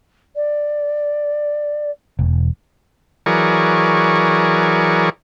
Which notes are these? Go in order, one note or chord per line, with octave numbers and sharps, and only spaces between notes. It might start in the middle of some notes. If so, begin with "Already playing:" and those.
D5
E1
E3 F#3 G#4 A#4 D5 C#6